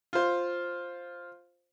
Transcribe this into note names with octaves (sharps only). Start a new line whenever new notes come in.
F4 C5